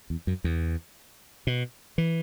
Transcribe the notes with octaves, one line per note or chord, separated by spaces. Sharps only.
E2
F#2
E2
B2
E3